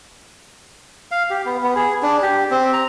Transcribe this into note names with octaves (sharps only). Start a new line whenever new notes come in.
F5
G4
B3
B3
G#4
D4
G4
C4
A#5